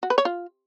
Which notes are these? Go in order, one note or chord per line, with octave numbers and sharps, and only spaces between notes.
F#4
B4
C#5
F4